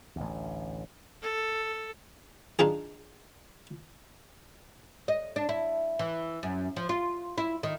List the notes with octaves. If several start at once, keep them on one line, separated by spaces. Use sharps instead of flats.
A1 D2
A4
D4 D#4 F4 G#4
D#5
D4
E4
E3
F#2
F3
F4
E4
D#3